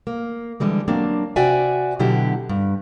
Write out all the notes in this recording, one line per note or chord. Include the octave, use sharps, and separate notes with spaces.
A#3
D3 E3 G3 G#3
F#3 A#3 C4 D4
C3 F#4 D5 E5 G5 G#5
B2 D3 F#3 E4 G4
G2